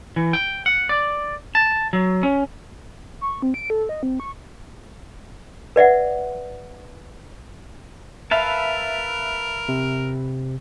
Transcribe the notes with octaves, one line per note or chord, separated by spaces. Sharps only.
E3
G5
F#5
D5
A5
F#3
C#4
C#6
C4
D7
A4
D#5
C4
C#6
B4 D5 E5 F#5
A#4 B4 E5 F5 A5
C3